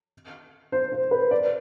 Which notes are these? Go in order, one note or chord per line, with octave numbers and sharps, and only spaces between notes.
C5
C5
B4
D5